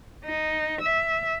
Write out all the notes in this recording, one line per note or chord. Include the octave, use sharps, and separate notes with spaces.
D#4
E5